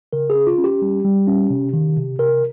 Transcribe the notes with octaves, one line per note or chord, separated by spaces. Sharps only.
C#3 A#4
G#4
C#4
F4
C#4
G4
G3
G3
C#4
C3
D#3
C3
C3 A#4